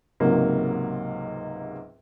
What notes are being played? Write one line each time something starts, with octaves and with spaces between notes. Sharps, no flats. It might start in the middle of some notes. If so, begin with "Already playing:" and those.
C#2 G#2 C3 F#3 A#3